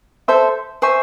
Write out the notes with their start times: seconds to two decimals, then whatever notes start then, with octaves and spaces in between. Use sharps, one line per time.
0.28 A4 C5 E5
0.82 C5 E5 G#5 C#6